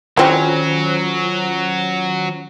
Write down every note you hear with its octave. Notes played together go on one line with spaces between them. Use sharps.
D#3 E3 F#3 C4 C#4 F4 G4 C5